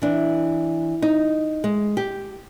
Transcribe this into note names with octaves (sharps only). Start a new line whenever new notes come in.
E3 D4
D#4
G#3
G4